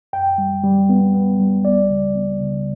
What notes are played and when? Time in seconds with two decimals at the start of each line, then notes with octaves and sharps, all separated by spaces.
0.13 F#2 G5
0.38 G3
0.64 G3
0.89 B3
1.14 B3
1.40 G3
1.65 C#2 D5
1.90 C#3
2.15 B3
2.41 C#3